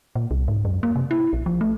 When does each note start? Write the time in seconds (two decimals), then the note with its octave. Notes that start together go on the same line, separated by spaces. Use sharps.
0.16 A#2
0.31 C2
0.48 G#2
0.65 F#2
0.83 A#3
0.96 C3
1.11 E4
1.33 A#1
1.46 F3
1.61 A3